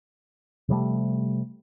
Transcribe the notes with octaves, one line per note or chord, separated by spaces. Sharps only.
C3 F3 G3 A3